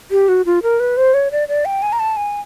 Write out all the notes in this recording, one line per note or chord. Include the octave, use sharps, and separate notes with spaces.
G4
F#4
F4
A#4
B4
C5
C#5
D5
D5
G5
G#5
A#5
A5
G#5